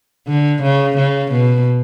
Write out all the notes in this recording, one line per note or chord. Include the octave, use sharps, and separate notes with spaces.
D3
C#3
C#3
B2